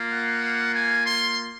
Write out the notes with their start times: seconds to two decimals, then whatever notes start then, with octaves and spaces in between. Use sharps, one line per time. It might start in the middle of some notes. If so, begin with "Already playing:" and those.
Already playing: A#3 F4
0.10 F#5
0.73 G#5
1.06 C6